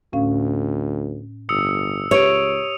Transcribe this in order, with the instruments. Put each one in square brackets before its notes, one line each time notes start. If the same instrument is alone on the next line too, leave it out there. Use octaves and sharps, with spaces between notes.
[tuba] D2 [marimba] A2 C#4 F5
[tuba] G1 [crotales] D#6 E6 C#7
[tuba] C#2 [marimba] G4 B4 C#6 [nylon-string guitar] C#5 [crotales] D7 D#7 F7